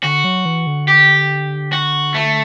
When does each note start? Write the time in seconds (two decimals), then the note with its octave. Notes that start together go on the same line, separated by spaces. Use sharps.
0.03 D3 F#4
0.24 F#3
0.45 E3
0.67 D3
0.88 G4
1.73 F#4
2.14 A3